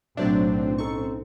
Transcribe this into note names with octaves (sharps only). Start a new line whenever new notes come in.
B1 A2 F#3 A3 C4 D4 C5 E5
C#4 D#4 A4 C#6